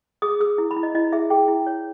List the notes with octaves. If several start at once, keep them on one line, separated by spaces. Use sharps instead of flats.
G#4 D#6
G#4 E6
E4
B5
E4
D#5
E4 D#5
G#4 E5
G#4 G5
E4
C#5